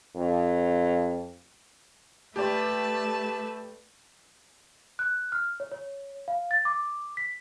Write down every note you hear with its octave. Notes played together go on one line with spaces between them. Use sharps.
F2
A3 G4 B4 D5 A5
F#6
F6
C#5
C#5
F5
A6
D6
B6